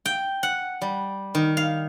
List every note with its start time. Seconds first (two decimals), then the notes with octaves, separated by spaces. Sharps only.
0.05 G5
0.43 F#5
0.82 G3
1.35 D#3
1.57 F5